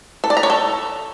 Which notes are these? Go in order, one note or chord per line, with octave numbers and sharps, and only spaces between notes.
A4
D5
A#5
C#5
A4